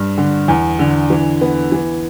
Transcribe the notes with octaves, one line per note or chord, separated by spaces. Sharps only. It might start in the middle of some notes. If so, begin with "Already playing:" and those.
Already playing: G2
D3
E2
D3
E3
B3
E3